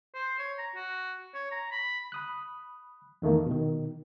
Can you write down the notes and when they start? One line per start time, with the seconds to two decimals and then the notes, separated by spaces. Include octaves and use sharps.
0.15 C5
0.39 C#5
0.58 A#5
0.75 F#4
1.34 C#5
1.51 A#5
1.71 B5
2.12 B5 D#6 F#6
3.22 E2 D#3 A3 A#3
3.46 B2 D#3